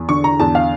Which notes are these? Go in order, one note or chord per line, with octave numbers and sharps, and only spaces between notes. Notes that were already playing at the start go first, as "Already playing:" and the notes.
Already playing: E2
D3 C#6
A#5
E2 A5
F5